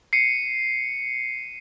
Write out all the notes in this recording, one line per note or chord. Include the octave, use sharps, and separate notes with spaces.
C7 C#7 D#7